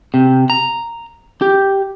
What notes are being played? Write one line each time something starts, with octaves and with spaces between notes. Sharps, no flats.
C3
A#5
G4